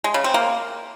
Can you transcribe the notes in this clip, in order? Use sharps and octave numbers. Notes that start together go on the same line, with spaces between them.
G#3
C#3
C4
A#3